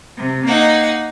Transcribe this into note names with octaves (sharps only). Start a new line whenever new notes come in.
C3
A#3 D#4 F#5